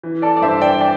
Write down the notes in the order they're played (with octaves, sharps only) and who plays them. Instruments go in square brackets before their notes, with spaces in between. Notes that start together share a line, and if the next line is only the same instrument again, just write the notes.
[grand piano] E3
A4 D5
D5
G2 C5 E5
D5 G5
D5 G5